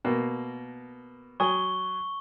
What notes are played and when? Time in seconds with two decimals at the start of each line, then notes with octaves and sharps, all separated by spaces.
0.05 B2 A#3
1.40 F#3 G#5 C#6 D#6 G7